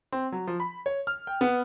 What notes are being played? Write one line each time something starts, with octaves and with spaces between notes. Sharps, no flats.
C4
F#3
F3
B5
C#5
F6
G5
B3